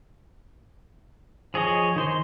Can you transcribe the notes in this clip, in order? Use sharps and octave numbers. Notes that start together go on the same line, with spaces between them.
F3 G#4 C#5 D#5
D#3 C5 C6